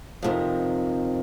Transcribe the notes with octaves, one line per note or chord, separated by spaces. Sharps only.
F2 C3 D#3